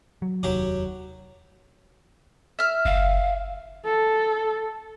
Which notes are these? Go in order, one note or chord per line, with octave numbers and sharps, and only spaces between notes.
F#3
F1 D#2 D#3 F#3 F#4 G4
E5 F6
F#1 F5
A4